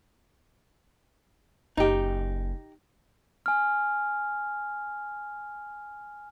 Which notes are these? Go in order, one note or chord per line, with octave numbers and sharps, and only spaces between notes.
F#1 D#4 G4
G#5 F6